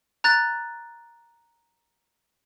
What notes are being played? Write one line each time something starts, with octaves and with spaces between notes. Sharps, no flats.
A#5 F#6 A6